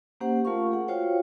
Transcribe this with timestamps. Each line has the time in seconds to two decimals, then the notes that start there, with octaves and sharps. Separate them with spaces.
0.21 A#3 C#4 G4 C5 F#5
0.45 A3 F4 A#4 F5 C#6
0.72 G#4 F#5
0.88 F4 F#4 C5 C#5 F5 G5